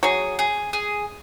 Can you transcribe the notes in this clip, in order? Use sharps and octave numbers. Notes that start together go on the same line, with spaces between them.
F#3 G#4
G#4
G#4